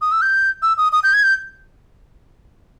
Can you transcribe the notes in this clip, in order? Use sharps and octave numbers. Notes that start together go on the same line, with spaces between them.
D#6
E6
G6
E6
D#6
D#6
G6
G#6
G6